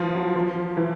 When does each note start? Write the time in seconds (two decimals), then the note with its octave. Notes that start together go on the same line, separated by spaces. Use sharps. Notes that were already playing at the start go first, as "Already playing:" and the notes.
Already playing: E3 F3
0.15 F#3
0.36 F3
0.77 E3